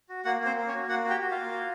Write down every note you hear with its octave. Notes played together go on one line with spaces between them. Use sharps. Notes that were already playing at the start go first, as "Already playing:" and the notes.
F#4
A#3 F#4 F#5
A#3
C4 C5
A#3
C#4 C#5
F#4
A#3 F#4 F#5
F#4
G4 G5
F#4
F4 F5
A#3
F#4